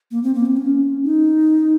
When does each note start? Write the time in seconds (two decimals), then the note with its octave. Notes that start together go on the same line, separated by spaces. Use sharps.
0.11 A#3
0.23 C4
0.35 A#3
0.46 C4
0.57 C#4
1.04 D#4